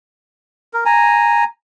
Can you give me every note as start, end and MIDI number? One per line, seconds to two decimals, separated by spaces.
0.73 0.84 70
0.85 1.44 80
0.85 1.44 82